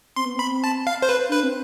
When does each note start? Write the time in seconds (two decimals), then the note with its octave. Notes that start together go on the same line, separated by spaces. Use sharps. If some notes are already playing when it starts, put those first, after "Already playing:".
0.16 C4 C6
0.25 B3
0.36 C4 B5
0.64 A5
0.87 F5
1.02 C5
1.09 B4
1.29 D4 B4
1.43 C4